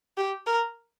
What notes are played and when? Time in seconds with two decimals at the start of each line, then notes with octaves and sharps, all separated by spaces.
0.17 G4
0.47 A#4